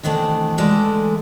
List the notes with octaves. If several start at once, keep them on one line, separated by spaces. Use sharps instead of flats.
C3 D#3 E3 A3 D4
D3 E3 G#3 A3 A4 D5